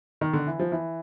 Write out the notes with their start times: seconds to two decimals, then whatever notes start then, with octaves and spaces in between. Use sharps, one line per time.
0.21 D#3
0.33 D3
0.47 E3
0.59 F3
0.72 E3